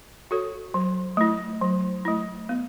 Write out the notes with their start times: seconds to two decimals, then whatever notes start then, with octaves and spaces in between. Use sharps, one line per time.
0.31 F#4 A4 C#5
0.74 F#3
1.17 A3 E4
1.61 F#3
2.05 A3 E4
2.49 B3